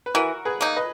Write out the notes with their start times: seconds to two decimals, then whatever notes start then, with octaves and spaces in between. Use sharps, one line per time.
0.06 B4
0.14 E3 F#4 A#4
0.45 G#4 B4
0.61 A#3 D#4
0.76 B4 D#5